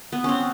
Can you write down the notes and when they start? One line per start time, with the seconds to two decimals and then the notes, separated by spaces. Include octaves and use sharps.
0.12 B3
0.24 C4 C#4